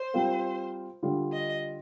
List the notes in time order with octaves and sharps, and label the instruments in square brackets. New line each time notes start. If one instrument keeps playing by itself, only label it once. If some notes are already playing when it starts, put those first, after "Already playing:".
Already playing: [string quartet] C5
[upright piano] G3 C4 F4 A#4 F5
D3 G3 D4 F4
[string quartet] D#5